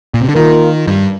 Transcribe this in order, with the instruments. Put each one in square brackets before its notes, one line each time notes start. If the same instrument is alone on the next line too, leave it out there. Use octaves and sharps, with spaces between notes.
[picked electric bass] A#2
C3
D3
[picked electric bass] D#3 [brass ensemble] A#3 F4 A#4
[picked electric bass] G2